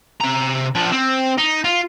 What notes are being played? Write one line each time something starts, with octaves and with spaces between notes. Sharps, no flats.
C3 A#5
F3 D4
C4
D#4
F4